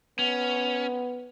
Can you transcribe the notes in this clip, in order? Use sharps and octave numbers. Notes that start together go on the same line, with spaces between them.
B3 C#4